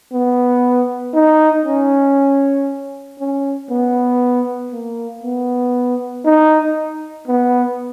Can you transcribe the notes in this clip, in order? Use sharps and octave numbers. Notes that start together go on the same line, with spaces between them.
B3
D#4
C#4
C#4
B3
A#3
B3
D#4
B3